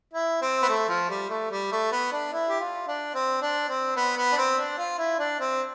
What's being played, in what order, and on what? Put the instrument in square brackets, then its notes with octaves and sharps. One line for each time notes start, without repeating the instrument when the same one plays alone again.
[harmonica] E4
C4
B3
A3
F3
G3
A3
G3
A3
B3
D4
E4
G4
F4
D4
C4
D4
C4
B3
B3
D4
C4
D4
F4
E4
D4
C4